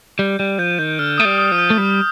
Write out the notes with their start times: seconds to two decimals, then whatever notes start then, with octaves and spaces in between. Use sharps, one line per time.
0.19 G3 G6
0.40 G3
0.58 F3 G6
0.79 D#3 G6
0.99 D3 F6
1.18 A3 D#6
1.25 G3
1.38 D#6
1.51 F3 F6
1.58 G6
1.70 A3
1.78 G3